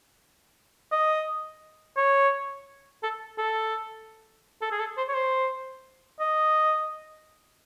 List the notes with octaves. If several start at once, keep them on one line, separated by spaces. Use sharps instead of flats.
D#5
C#5
A4
A4
A4
G#4
A4
C5
C#5
C5
D#5